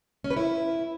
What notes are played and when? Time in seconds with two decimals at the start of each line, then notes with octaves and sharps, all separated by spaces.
0.24 C#4
0.30 B4
0.37 E4